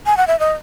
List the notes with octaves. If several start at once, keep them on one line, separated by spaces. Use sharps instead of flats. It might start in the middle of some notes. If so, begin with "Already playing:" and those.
G#5
F#5
E5
D#5